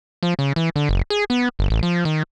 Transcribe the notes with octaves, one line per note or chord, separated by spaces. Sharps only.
F3
C#3
E3
D3
F#1
G#4
B3
G1
A1
F3
D#3